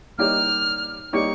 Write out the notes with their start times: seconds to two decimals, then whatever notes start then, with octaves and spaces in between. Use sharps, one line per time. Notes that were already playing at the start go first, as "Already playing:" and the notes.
0.18 G3 A#3 D#4 G4 C#5 F6
1.13 G3 A#3 D#4 G4 C#5 C#6